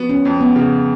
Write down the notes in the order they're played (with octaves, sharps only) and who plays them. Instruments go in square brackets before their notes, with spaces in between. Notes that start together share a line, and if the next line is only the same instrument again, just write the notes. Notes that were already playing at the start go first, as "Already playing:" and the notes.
Already playing: [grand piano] F3 B3 F#4
[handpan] C#4
[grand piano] F2
[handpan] B3
[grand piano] C#3